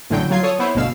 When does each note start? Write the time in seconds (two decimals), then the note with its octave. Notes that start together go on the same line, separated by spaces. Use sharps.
0.10 A1 A2 D3 F#3 G5
0.30 F#3 F4 G#6 C7
0.43 A4 C#5 D#6
0.59 B3 E4 C5 C#5
0.75 G1 D2 B2 F5 E6